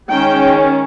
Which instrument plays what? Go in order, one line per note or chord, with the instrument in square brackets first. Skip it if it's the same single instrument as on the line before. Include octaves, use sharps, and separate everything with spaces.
[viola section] D#3 G#3 C#4 G5